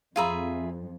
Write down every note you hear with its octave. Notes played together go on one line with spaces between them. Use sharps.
F2 F4 G#4 E5 F5 A#5 B5